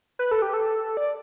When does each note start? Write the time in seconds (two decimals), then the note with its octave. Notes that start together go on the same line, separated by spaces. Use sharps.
0.19 B4
0.31 A4
0.42 G4
0.54 A4
0.97 D5